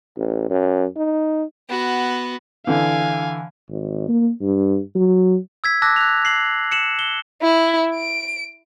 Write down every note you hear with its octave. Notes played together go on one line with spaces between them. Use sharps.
A1
F#2
D#4
B3 F#4
D3 E3 F5 G#5
G#1
A#3
G2
F#3
E6 G#6 B6
A5 D6 E6 F#6 A#6
F#6 F7
C7 F#7
C#7 E7 F#7
G7
E4
D7